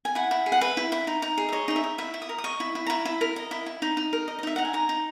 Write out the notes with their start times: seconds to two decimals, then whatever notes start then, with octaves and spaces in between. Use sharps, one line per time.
0.05 G#5
0.15 E4 F#5
0.31 E4
0.46 G#4
0.52 F#5
0.61 B4 E5
0.77 E4
0.92 E4
1.07 D#4
1.22 D#4
1.38 G#4
1.49 E5
1.52 C#5 D#5
1.68 D#4 D#5
1.76 E5
1.84 D#4
1.98 E4 E5
2.14 E4
2.22 D#6
2.29 A#4
2.38 D#6
2.44 D#5 C#6
2.60 E4
2.75 E4
2.86 A#5
2.90 E4 B5
3.05 E4
3.21 A#4
3.36 D#5
3.51 E4
3.66 E4
3.82 D#4
3.97 D#4
4.13 A#4
4.28 D#5
4.39 D#5
4.43 D#4 E5
4.56 D#4 F#5
4.65 G#5
4.73 D#4 A#5
4.89 D#4